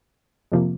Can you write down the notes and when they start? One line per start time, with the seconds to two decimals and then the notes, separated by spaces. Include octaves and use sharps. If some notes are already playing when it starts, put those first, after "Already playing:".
0.52 F2 C3 F3 A#3